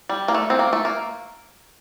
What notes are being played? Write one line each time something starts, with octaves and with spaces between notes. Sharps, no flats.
G3
A#3
A3
C4
A#3
A3
A#3